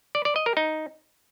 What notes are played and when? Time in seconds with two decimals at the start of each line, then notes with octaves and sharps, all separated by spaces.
0.15 D5
0.25 D5
0.36 D#5
0.46 A#4
0.57 D#4